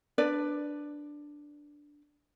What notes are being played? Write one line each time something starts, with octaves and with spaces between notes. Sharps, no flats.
D4 B4 D5